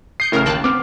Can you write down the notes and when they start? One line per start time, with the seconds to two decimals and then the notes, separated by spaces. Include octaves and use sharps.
0.20 D#6 G6 C7 C#7
0.32 A1 A2 C#3 A#4 F6
0.46 D#2 G5 A5 F#6
0.64 B3 C4 D6 F6